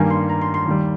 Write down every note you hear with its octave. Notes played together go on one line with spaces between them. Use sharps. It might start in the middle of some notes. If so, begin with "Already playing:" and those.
Already playing: G2 D#3 G3 A#3 G#5
C6
A#5
C6
C6
D#2 D#3 G3